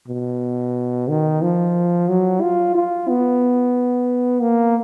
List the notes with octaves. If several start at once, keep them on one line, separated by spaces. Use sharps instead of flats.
B2
D#3
F3
F#3
F4
F4
B3
A#3